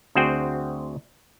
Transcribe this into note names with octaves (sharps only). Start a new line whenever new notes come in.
D2 C4 F#4 G#4 C5 G5